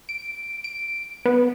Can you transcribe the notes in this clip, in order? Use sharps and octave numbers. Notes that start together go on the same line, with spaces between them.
D7
D7
B3